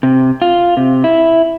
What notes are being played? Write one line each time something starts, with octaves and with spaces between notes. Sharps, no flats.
C3
F4
C3
E4